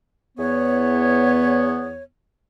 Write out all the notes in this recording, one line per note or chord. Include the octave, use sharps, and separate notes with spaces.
E2 B3 C#5